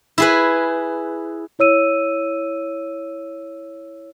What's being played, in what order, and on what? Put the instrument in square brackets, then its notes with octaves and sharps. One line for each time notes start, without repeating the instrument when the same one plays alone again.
[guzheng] E4 G#4 B4
[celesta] E4 C#5 E6 D#7